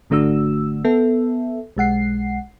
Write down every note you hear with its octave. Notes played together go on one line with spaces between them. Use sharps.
G#1 D3 A3 D4 F#4 E6
B3 A4 E5
B1 G#3 F#5 C7